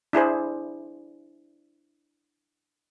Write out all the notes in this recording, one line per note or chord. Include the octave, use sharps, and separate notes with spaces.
D4 E4 G#4 C5